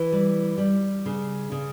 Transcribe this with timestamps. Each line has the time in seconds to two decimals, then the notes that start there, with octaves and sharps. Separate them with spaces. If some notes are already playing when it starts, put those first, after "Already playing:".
Already playing: E3
0.12 G3
0.58 G3
1.06 C#3
1.52 C#3